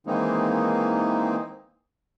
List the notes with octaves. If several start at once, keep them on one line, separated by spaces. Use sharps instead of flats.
D#3 E3 G#3 A#3 C4 D#4